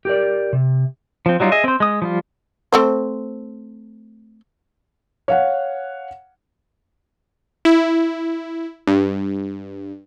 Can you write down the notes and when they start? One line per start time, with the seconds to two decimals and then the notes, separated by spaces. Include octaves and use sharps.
0.05 G4 A#4 D5
0.53 C3
1.26 F3 C4
1.40 F#3 G3 D#4 F4
1.52 G#4 D#5 E5
1.64 C4 C5
1.80 G#3 D#6
2.02 F3 G3 F4
2.72 A3 C4 C5
5.28 C#5 F5 F#5
7.65 E4
8.87 G2